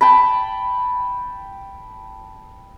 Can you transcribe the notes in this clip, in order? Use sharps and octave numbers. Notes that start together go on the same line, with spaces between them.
G5 A5 B5